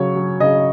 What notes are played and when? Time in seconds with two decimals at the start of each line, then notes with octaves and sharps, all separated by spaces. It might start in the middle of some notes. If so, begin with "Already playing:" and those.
Already playing: C#3 F#3 C#5
0.15 F#3
0.40 C#3 D#5